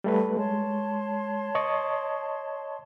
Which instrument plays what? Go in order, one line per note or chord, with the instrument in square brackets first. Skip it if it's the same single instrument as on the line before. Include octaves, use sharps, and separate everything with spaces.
[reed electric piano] G3 A3 B4
[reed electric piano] G#3 [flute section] C#5 A5 C6
[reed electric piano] D#5 C#6 D#6